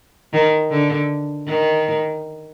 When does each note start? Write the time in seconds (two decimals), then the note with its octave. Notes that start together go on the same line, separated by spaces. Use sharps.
0.33 D#3
0.70 D3
1.47 D#3